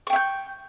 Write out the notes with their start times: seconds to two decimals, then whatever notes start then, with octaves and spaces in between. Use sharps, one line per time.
0.07 C#6
0.10 G5
0.13 E5
0.16 G6